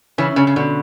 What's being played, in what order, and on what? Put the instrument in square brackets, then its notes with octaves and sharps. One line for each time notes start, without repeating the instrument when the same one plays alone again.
[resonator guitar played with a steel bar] C#3 E3 [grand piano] C#4
[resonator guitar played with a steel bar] C#3 [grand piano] C#4
[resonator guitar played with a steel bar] C#3
[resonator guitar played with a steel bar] B2 [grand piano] D3